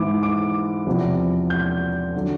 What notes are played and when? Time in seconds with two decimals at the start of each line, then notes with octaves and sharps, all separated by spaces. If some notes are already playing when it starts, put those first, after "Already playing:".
Already playing: G#2 E3 D6
0.23 D6
0.87 E2 C3 F3
1.50 G6
2.16 D3 F#3